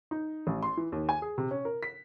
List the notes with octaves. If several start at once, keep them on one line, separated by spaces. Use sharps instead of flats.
D#4
A1
C6
E3
D#2
G#5
G#4
C3
C#4
A#4
B6